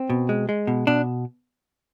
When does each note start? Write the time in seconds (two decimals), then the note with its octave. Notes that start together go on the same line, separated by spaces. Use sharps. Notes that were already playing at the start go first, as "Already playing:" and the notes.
Already playing: C4
0.10 B2
0.29 G#3
0.49 G#3
0.67 B2
0.87 B2 D4